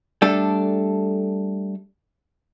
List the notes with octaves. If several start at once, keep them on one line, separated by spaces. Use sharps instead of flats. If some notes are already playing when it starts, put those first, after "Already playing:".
G3 A3 D4 A4